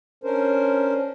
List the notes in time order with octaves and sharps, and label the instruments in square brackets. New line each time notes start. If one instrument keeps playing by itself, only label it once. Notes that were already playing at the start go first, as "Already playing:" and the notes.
[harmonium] C#4 D4 A#4 C5